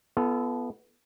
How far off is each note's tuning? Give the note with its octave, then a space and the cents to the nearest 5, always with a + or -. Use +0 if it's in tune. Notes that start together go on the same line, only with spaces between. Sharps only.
B3 +0 F4 -45 A4 -20